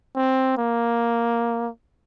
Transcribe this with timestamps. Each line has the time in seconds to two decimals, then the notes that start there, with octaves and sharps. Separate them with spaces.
0.16 C4
0.58 A#3